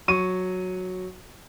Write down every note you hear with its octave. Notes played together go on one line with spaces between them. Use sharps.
F#3 C#6 D#7